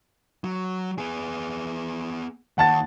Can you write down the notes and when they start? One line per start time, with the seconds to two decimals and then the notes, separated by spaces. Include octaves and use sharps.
0.44 F#3
0.98 B3 G#4
2.58 D#2 F#5 A5 A6